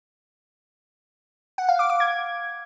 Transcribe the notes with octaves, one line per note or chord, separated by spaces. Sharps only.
F#5
F5
D6
D6
G#6